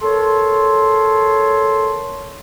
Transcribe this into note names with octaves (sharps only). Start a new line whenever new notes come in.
A4 A#4 C#5 C6